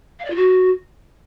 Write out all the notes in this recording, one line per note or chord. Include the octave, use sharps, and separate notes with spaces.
F5
D5
F4
F#4